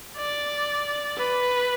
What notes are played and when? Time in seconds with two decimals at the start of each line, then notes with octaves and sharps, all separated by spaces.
0.17 D5
1.18 B4